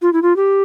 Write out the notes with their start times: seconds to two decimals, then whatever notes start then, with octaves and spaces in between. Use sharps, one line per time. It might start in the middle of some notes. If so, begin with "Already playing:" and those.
0.02 F4
0.13 E4
0.22 F4
0.36 G4